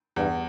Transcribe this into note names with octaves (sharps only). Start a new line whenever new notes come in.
E2 G2